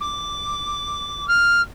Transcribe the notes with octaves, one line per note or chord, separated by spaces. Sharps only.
D6
F6